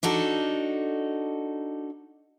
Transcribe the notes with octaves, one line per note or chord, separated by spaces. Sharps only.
D4 D#4 F#4 A4